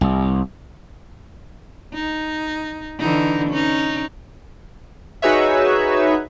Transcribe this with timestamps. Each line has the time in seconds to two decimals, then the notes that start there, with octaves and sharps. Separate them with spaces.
0.01 C2
1.94 D#4
2.99 D3 E3 D#4
3.50 C#4 D#4
5.22 D#4 F#4 G#4 B4 C#5 E5